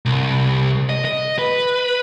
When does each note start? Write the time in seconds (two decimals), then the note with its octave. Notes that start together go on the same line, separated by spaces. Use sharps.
0.06 C2
0.89 D#5
1.05 D#5
1.39 B4